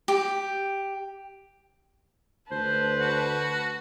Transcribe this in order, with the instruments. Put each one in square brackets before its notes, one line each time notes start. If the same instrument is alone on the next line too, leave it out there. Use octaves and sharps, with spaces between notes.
[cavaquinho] G4
[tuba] D2 [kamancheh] B4 A5 [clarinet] C5
[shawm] F#4